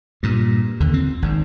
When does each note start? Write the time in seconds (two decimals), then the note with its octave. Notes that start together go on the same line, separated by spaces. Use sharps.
0.23 G2 A#2
0.80 D#2 D3
0.94 C4
1.22 G#1 G#2